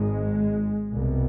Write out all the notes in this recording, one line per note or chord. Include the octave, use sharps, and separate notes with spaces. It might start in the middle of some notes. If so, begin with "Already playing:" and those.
Already playing: G#1 G#2 G#3
C2 B2